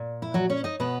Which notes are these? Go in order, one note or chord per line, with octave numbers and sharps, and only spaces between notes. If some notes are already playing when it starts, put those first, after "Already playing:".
Already playing: A#2
E4
F#3 F#4
C#4 C#5
D#4 D#5
B2 B3 B4